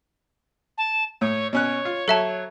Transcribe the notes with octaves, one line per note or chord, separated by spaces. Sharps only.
A5
A2 C#5
B2 C#4 C#5 F#6
F4
F#3 A4 E5 A5